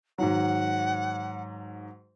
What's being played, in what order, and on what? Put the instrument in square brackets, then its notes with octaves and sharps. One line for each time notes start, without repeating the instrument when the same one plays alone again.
[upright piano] G#2 D#3 F#3 [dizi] F#5